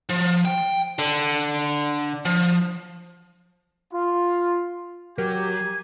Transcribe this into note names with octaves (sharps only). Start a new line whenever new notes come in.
F3
G5
D3
F3
F4
F#3 G4 A#4 G#5